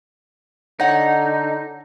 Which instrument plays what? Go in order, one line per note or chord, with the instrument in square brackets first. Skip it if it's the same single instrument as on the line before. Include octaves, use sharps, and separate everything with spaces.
[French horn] D3 [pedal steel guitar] D#4 [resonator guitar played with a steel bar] C#5 F#5